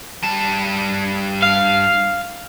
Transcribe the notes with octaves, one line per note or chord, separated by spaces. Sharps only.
G2 A5
F5